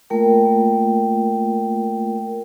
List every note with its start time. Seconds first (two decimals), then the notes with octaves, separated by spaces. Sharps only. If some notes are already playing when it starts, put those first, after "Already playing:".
0.10 A3 A#3 F4 A#4 G5